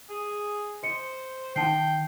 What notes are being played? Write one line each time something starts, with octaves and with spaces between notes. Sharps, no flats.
G#4
C5 D#5 C#7
D#3 D#4 F#5 G5 A5 C7